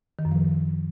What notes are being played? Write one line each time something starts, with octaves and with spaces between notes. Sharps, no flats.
D#3
F#2
F3